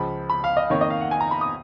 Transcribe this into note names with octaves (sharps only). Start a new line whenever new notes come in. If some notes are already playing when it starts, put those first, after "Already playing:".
Already playing: C#2 C#3 F3 B5
B5
F5
D#5
F2 D#3 A#3 C#5
D#5
F5
F#5
G#5
A#5
B5
D#6